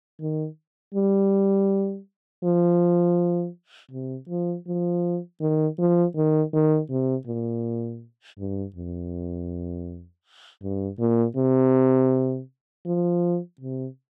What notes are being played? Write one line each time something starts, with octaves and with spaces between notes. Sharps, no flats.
D#3
G3
F3
C3
F3
F3
D#3
F3
D#3
D#3
C3
A#2
G2
F2
G2
A#2
C3
F3
C3